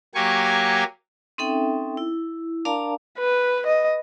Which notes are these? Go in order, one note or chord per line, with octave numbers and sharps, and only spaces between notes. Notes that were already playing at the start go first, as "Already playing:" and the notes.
F#3 A#3 G4 G#5 C#6
C4 C#4 D#4 A4 E5 G5
E4
D4 A#4 D5 F5 A5 A#5
B4
D#5